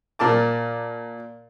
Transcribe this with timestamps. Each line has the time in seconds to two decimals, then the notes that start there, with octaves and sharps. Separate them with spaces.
0.19 A#2 A#4 A5 D6